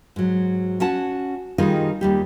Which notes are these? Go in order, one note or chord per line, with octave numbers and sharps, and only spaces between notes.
G#2 F#3
C#4 F#4 F#5 A5
D#3 G3 D#4 F4 G#4
D#2 G3 G4